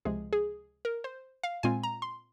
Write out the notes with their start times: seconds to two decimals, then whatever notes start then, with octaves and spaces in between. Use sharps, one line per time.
0.05 C#2 C3 F3 G#3 G#4
0.33 G#4
0.85 A#4
1.04 C5
1.43 F5
1.63 A#2 G#3 C4 F4 G#5
1.83 A#5
2.02 C6